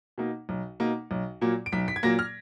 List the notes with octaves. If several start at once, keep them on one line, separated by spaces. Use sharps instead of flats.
B2 A#3 D#4
B1
B2 A#3 D#4
B1
A#2 F#3 A#3
D7
B1 B6
B6
G#6
A#2 F#3 A#3 A#6
F6